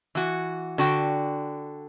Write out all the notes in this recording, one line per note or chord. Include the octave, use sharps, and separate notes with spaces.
E3 F#4
D3 F#4 G5